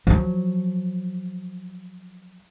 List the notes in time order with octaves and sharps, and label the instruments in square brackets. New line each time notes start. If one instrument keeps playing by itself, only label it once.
[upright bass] F3 F#3